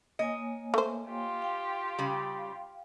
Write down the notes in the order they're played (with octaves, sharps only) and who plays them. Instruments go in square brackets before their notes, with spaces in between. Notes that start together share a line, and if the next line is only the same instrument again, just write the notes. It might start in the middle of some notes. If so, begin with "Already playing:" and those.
[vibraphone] A#3 C#5 G#5 [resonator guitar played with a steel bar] D#5
[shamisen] A3 C5
[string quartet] F4 G4
[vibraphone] F5 G5
[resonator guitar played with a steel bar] C#3 G3